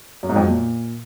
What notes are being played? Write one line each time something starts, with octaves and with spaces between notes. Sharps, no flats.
F#2
G#2
F2
F#3
A#2